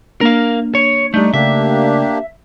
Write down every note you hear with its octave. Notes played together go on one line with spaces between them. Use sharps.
A#3 D4 A#4 F5
C#5
G3 A3 D4 D#4 G6
C#3 A3 A#3 D4 G4 E5